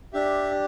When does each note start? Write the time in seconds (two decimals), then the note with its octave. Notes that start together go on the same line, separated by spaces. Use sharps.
0.13 D4 G4 E5